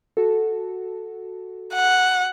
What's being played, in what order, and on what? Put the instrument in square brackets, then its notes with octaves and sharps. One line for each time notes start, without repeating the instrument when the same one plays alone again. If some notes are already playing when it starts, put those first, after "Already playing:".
[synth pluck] F#4 A4
[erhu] F#5